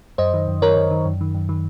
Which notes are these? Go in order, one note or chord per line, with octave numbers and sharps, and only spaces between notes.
F#2 C5 D#5
D#3
F#2
D#3 A#4 C#5
F#2
D#3
F#2
D#3
F#2
D#3